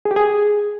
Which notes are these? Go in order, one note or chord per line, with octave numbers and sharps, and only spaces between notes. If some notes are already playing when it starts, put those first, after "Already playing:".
G#4
G4
G#4